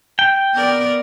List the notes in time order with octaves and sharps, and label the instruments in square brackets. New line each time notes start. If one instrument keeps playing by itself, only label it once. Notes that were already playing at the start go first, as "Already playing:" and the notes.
[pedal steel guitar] G5
[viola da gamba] B3 A#4 D5